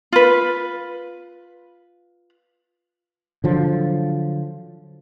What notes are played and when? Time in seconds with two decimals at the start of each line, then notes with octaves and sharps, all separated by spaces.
0.12 F4 B4
3.44 D3 F3 F#3